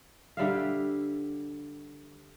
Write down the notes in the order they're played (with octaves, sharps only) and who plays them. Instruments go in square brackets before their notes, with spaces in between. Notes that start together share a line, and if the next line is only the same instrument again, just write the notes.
[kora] D3 G3 E5 F5